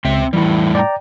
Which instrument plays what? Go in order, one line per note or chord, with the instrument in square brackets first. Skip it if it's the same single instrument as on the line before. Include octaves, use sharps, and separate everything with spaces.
[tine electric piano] C#2 [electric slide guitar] C4 E5
[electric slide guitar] A2 G3 [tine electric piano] E3 E4
[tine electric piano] D5 G5 A#5